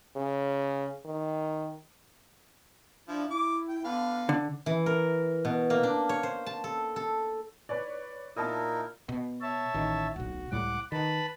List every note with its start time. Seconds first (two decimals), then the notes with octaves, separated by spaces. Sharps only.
0.16 C#3
1.05 D#3
3.08 F3 D4 E4
3.30 E4 D6
3.69 G5
3.85 D3 B3 B4 F5
4.29 D3
4.66 E3
4.86 A#4
5.45 B2
5.70 A#3
5.83 D4
6.09 C#5
6.23 C5
6.46 A5
6.64 A4
6.96 A4
7.69 B4 C#5 D5
8.37 A#2 D#4 E4 A#4 A5 D#6
9.09 B2
9.41 C#5 E5 A5
9.74 A1 D#3
10.16 D1 B1 F#4
10.52 C#2 A2 G3 F#5 D6
10.92 D#3 B4 A5 B5